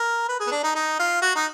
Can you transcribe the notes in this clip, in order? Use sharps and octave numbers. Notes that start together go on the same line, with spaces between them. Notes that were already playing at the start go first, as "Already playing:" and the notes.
Already playing: A#4
B4
G#4
B3
D4
D#4
D#4
F4
F#4
D#4